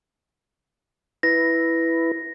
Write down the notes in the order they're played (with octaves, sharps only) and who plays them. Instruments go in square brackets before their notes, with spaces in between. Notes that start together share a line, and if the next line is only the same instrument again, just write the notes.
[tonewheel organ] E4 B4 [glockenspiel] A#6